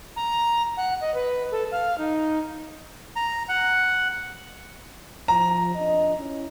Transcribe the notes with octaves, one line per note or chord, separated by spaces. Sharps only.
A#5
F#5
D#5
B4
A4
F5
D#4
A#5
F#5
F3 A#5
F2 D4 D#5
C#4 E4